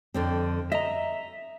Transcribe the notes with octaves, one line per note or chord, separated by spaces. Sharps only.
F2 D3 C4
D#5 E5 A#5